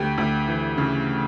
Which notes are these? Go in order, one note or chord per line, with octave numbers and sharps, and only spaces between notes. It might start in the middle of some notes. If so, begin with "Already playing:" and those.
Already playing: D2 G4
D2
E3
C#3